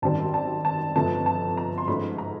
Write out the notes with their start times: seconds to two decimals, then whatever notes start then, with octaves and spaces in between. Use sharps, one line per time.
0.02 G#1 F#2 D#3 G3 C4 A5
0.34 A5
0.65 A5
0.96 G1 F2 C3 F3 A3 A5
1.26 A5
1.57 A#5
1.78 C6
1.88 G#2 F3 A3 C#4 B5
2.18 A#5